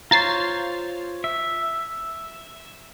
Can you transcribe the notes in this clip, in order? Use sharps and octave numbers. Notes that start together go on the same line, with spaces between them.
F4 C5 C#5 A#5 A6 C7
E5